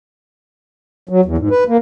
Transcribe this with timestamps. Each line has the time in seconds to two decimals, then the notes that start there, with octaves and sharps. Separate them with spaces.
1.09 F#3
1.25 E2
1.38 G#2
1.51 B4
1.68 A#3